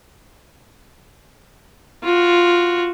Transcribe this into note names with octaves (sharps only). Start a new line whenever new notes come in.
F4 F#4